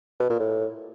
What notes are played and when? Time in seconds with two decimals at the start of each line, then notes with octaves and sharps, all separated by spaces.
0.20 B2
0.30 A#2
0.40 A2